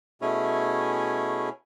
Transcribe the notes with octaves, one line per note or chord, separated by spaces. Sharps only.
B2 A3 C#4 E4 G#4 C#5